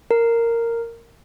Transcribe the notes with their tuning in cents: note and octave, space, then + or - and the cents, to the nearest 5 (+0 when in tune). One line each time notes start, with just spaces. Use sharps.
A#4 -10